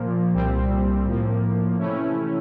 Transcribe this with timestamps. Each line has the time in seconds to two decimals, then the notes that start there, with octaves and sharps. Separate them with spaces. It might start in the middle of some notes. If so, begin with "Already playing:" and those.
Already playing: A#2 F3 A#3
0.33 C2 A#2 G3 C4
1.05 A2 F3 A#3
1.78 C3 E3 A3 C#4 E4